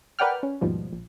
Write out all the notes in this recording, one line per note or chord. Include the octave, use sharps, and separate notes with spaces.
A#4 B4 D5 F#5 G5 F6
C#4
D#2 G#2 B2 F3 G3
A#1